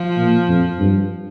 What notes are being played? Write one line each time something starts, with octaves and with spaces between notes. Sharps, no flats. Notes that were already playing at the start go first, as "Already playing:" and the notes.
Already playing: F3
A#2
F2
G2